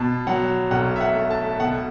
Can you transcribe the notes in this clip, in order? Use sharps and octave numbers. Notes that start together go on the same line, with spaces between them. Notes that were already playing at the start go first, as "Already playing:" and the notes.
Already playing: B2 A5
F#3 F#5
B1 F#5
E5
F#5
A3
A5
B2 F#5